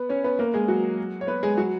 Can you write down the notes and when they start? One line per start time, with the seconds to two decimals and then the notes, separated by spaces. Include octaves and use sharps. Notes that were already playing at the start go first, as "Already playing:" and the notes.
Already playing: B3 B4
0.09 C#4 C#5
0.24 B3 B4
0.39 A#3 A#4
0.54 G#3 G#4
0.68 F#3 F#4
1.21 C#5
1.27 B3 B4
1.43 G#3 G#4
1.57 F#3 F#4